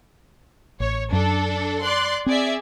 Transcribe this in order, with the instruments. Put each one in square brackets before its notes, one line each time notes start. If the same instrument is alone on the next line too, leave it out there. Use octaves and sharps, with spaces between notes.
[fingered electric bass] A1 [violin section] C#5
[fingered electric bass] F#2 [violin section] D4 A4
[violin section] D5 C6 F#6
[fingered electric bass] C4 [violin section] G#4 D5 E5